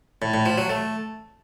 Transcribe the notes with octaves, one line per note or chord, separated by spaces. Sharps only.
A2
A2
F3
F#3
A3